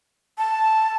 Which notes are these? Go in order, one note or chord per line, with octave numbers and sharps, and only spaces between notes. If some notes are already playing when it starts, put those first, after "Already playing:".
A5